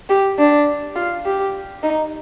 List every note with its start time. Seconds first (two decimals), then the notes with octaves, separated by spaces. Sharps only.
0.09 G4
0.38 D4
0.96 F4
1.25 G4
1.83 D#4